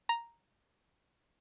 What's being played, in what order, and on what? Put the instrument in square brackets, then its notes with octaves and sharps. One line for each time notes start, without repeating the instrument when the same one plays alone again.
[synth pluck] A#5